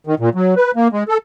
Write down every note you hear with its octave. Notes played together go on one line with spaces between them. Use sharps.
D#3
A#2
F#3
B4
A#3
G#3
A4